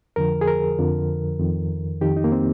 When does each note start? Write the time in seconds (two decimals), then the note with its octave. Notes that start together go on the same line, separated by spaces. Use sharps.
0.16 F2 D3 F3 A#4
0.41 G#4
0.48 A#4
0.78 F2 D3 F3
1.40 F2 D#3
2.01 F2 D#3 G4
2.17 D#4
2.24 A#3
2.32 C4